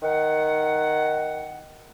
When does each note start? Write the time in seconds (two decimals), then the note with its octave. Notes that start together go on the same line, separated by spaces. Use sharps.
0.03 D#3 F#5